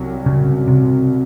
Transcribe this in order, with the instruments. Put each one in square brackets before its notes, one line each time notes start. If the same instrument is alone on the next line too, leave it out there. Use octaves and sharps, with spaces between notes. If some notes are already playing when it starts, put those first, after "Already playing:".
Already playing: [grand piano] C2 C3 F#3
[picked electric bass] C#3
C3